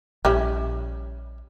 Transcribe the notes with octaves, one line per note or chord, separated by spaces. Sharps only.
A#1 G3 C#4 E4